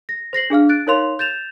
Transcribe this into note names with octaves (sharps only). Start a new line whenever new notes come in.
A#6
C5 A#6 C7 F#7
D4 G#4 F5 F6
F#6 A6 D7
D#4 A#4 C#5 F5 C6 F7
G6 A6 E7 F7